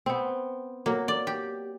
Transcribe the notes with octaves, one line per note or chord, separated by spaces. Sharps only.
B3 C4
F#3 A#3
D5
G4